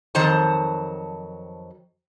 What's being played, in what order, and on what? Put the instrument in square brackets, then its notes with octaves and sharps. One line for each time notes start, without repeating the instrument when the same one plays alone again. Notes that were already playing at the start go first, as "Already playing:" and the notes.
[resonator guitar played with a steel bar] F2 D#3 F#3 C5 A5